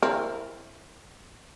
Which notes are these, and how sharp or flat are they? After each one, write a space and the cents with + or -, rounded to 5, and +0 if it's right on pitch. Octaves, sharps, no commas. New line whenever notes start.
C4 +20 E4 +10 A#4 +0